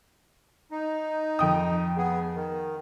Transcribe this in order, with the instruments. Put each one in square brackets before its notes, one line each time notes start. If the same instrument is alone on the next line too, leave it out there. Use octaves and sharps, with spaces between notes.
[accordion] D#4
[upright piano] F2 G5 D#6
[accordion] B3 G#4
D#3